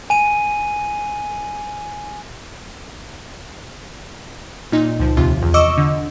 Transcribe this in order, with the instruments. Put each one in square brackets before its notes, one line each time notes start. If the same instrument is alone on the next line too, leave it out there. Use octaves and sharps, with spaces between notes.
[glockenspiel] G#5 D#7
[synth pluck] A#2 D#4
C#2 F3
D#2 C3 F4
E2
D#5 C#6 D6 E6
D3